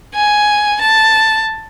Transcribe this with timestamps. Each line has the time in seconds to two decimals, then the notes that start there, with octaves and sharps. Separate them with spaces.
0.15 G#5
0.81 A5